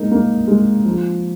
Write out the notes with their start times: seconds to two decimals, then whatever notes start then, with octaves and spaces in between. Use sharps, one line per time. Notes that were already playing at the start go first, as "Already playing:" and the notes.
Already playing: G#3 A#3 D#4
0.11 A#3
0.48 G#3
0.84 F3